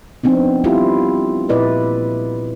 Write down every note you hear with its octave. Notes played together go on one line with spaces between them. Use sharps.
F3 B3 C4 D4 D#4
G3 E4 F4 G4
A#2 E4 B4 D5 D#5